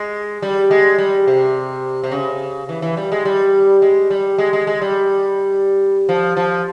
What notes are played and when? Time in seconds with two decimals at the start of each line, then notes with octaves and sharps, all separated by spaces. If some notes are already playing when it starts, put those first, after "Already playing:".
Already playing: G#3
0.42 G3
0.71 G#3
0.98 G3
1.28 C3
2.03 C3
2.12 C#3
2.69 E3
2.82 E3
2.97 G3
3.12 G#3
3.25 G3
3.82 G#3
4.10 G3
4.38 G#3
4.53 G#3
4.67 G#3
4.81 G3
6.09 F3
6.37 F3